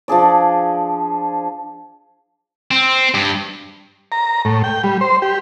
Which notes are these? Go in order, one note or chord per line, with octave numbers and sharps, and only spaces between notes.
F3 D4 G#4 D5
C4
G2
A#5
A2
G5
G3
C5
G4